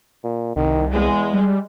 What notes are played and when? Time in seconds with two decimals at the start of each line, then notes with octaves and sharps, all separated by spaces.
0.24 A#2
0.56 C2 D#3
0.94 E2 G#3
1.33 G3